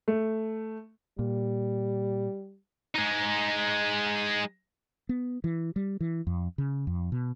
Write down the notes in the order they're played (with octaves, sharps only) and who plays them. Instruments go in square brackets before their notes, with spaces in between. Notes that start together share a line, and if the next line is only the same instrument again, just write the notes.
[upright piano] A3
[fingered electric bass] A#2 [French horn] G3
[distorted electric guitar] G#3 D#4
[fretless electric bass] B3
E3
G3
E3
F2
C#3
F2
B2